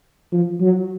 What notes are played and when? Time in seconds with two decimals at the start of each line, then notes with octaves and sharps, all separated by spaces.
0.32 F3
0.61 F#3